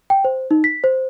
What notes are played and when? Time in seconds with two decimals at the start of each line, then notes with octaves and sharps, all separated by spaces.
0.10 G5
0.24 C5
0.51 D#4
0.64 B6
0.84 C5